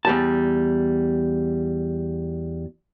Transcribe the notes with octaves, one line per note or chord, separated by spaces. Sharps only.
E2 G3 A5